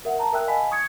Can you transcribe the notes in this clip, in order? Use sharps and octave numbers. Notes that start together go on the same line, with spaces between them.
A#4 E5 F#5
A5 A#5
A#4 E5 G5 E6 F#6
D#5 F5 G#5 A5 B5 B6
C#6 D#6 G#6 C#7